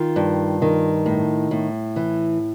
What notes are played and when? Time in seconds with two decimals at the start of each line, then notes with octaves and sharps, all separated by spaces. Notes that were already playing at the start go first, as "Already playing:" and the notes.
Already playing: D#3 F4
0.16 G2
0.62 D#3
1.06 A2
1.51 A2
1.96 E3